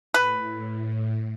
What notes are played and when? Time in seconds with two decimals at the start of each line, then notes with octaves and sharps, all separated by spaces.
0.14 A2 B4